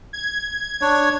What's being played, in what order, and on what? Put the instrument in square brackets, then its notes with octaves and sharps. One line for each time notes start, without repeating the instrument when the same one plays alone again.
[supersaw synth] G#6
[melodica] D4 C#5